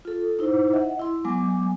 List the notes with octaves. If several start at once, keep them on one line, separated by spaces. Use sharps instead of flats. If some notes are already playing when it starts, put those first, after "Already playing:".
F4 A4
D#4 E4 C5
D#5 E5 F#5
E4 C6
F#3 G#3 B3 G#5 D6